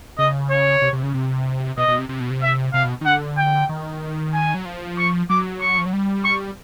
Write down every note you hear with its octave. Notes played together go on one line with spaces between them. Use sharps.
C#3 D#5
C#5
C3
C3
C#3
C3
B2 D#5
B2
C3
C3
B2
C3
E5
C3 F5
B2
D#3
D3 F#5
G5
D#3
G#5
F#3
F3
C#6
F#3 D6
C#6
F3
F#3
G3
C#6